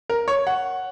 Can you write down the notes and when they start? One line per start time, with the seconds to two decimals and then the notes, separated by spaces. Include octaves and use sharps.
0.10 A#4
0.28 C#5
0.47 F#5